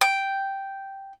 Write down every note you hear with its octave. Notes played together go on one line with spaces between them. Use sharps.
G5